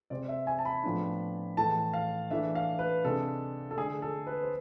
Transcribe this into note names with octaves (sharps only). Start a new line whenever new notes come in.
C3 G#3 C4 D5
E5
G#5
A5
B5
A2 F3 B3 D4
A2 E3 A3 A5
F5
E3 A3 D4 E5
F5
B4
C3 G#3 D4 A4
A4
D3 A3 D4 G#4
A4
B4
C5